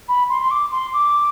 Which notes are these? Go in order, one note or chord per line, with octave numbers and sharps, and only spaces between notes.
B5
C6
C6
D6
C6
D6